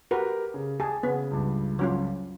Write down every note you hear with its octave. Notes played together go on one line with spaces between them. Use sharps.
F#4 G4 A#4 B4
C#3
G4 G#4 A5
C#3 B3
C#2 G2
F#3 C#4 F4